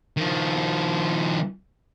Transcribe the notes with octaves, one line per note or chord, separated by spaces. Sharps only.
D#3 F3